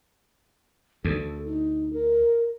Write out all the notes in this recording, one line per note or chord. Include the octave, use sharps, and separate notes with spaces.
D2 A4
D#4
A#4